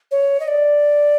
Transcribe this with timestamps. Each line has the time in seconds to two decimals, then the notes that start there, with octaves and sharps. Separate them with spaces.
0.11 C#5
0.40 D#5
0.48 D5